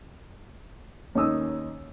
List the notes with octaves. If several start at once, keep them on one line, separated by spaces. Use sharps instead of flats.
D#2 C#4 D#4 D#6 E6